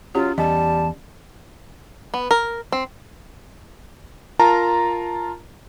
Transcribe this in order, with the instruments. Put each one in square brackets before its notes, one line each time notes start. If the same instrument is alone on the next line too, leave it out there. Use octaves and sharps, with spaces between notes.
[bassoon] F#3 [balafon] C#4 G4 [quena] F4
[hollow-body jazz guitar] E2 [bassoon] G3 [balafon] D#5 [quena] A5
[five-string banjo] B3
A#4
C4
[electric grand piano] F4 A#4 A5 A#5